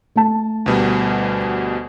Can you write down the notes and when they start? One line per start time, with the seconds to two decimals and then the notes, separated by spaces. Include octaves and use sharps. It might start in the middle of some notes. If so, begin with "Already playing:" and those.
0.16 A3 A5
0.66 D2 B2 G3